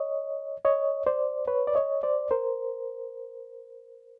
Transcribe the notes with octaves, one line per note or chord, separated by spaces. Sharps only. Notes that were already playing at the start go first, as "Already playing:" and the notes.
Already playing: C#5 D#5
C#5 D#5
C5 D5
B4 C#5
D5
C#5 D#5
C5 D5
A#4 C5